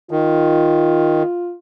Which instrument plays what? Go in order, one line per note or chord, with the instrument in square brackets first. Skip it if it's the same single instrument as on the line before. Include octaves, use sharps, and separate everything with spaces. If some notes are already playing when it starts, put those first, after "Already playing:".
[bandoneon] D#3 [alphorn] F4